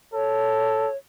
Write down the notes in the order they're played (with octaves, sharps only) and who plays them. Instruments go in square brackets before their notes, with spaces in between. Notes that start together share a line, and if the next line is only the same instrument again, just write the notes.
[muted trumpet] A4 [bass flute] C#5